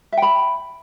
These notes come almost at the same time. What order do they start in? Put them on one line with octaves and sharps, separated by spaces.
E5 G5 B5